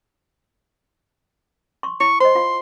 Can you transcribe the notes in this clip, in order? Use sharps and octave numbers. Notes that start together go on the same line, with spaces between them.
C6 C#6
E4 C#6
C5 D#5 C6
F4 F5